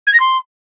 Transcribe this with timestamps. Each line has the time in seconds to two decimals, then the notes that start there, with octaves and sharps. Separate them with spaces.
0.07 G#6
0.13 A#6
0.20 C6